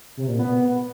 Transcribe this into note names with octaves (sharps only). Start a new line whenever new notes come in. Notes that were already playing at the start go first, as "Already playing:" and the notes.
C3
A#2
B3